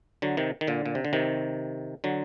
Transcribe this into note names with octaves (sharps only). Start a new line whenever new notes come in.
D3 F#3
C3 D#3
D#3
A#2 D3
A#2
C3
D3
C3 D#3
D3 F#3